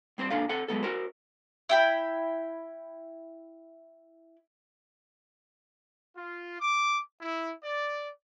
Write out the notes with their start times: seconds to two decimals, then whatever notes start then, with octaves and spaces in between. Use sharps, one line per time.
0.18 G2 C4 C5 C6
0.30 A#2 D4 A4 F5
0.49 C4 A4 F#5
0.68 F#3 G#3 B3 A4
0.83 F#4 A#4 C5
1.69 E4 G5 B5
6.15 F4
6.60 D6
7.21 E4
7.63 D5